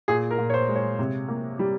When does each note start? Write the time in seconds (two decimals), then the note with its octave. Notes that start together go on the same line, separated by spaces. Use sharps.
0.08 A#2 G#4
0.31 A#4
0.38 A#2
0.50 C#5
0.54 C5
0.68 G#3
0.76 C#5
0.99 C3
1.28 A#3
1.59 G3